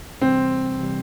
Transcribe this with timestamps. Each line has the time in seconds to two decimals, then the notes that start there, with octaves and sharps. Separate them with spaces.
0.21 C3 E3 G3 C4
0.80 C3 E3 G3